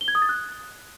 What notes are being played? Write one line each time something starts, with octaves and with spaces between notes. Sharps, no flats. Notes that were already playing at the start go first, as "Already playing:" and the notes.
G7
G#6
D#6
A6
F#6